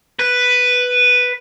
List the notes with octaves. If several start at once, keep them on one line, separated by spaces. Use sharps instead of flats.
B4